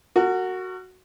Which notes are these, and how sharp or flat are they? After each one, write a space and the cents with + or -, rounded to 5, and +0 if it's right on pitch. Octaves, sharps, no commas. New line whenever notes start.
F#4 +0 A#4 -40